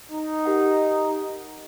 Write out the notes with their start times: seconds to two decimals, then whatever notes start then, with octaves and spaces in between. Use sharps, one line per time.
0.10 D#4
0.45 G4 A#4 F#5